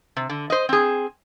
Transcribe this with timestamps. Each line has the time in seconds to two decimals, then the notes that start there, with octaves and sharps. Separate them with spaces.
0.17 C3
0.29 D3
0.50 C5 D#5
0.69 C4 G#4